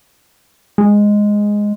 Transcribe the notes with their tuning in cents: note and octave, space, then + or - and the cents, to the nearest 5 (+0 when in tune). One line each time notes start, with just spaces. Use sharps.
G#3 -5